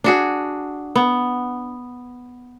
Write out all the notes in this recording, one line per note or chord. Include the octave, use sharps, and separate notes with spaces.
D4 F#4 G#4
B3